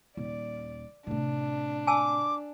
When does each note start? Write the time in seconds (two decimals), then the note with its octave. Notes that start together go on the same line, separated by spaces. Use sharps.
0.17 D#1 D5
1.07 A2 C3 D4
1.87 G#5 A5 D6 E6